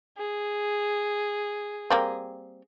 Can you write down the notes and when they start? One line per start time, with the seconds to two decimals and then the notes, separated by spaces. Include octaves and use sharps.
0.18 G#4
1.90 G3 A#3 C4